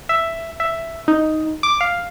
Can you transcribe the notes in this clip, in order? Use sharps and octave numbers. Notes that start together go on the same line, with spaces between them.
E5
E5
D#4
D6
F5